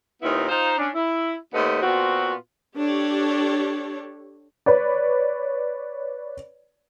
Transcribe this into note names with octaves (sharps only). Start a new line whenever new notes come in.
D#2 A#2 B3 C4 D#4 E4
D#4 F4 C5
C#4 D4
E4
D#2 A3 B3 C4 D#5
A#2 B3 C4 F4 F#4
D4 G4 A4 C#5
B4 C#5 D5